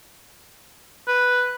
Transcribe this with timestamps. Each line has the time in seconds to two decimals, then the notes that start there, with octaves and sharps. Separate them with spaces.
1.08 B4